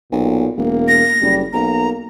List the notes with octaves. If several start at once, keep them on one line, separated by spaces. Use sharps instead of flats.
B1 A#2
E1 A#3
A#6
F#1 G3
B1 A#3 A#5